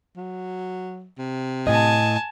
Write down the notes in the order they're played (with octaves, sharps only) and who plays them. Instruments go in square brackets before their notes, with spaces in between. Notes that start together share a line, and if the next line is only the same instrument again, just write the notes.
[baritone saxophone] F#3
C3
[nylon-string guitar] A2 D#5 [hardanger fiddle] G#5 A5